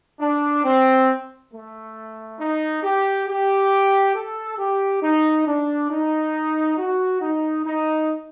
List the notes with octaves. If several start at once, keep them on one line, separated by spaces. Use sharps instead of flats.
D4
C4
A3
D#4
G4
G4
A4
G4
D#4
D4
D#4
F#4
D#4
D#4